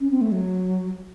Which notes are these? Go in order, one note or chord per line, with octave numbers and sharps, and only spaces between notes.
C#4
C4
A3
F#3